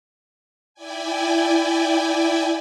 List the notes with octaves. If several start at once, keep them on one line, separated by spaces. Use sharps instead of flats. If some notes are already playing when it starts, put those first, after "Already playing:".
E4 D5 G5 G#5